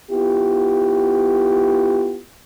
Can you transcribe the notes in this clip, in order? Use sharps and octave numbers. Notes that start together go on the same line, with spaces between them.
B3 E4 F4 G4